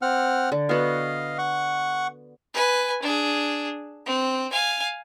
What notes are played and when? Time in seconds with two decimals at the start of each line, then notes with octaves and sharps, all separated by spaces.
0.02 C4 F#5 F6
0.52 D3
0.69 B3 F#4 D#5 F5
1.38 F#5 C#6
2.54 B4 G#5
3.02 D4 G#4
4.06 C4
4.52 F5 G#5